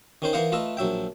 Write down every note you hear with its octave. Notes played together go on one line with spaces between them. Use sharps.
D#3 C#4 C5
E3 A#4 C5 F5 F#5 D#6
A3 F4 B4 D#5 E5
A#1 F#3 E5 G5